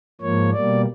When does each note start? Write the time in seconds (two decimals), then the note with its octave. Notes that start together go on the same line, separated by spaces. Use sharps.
0.21 G#2 F3 A#3 C#5
0.53 B2 G3 A#3 D5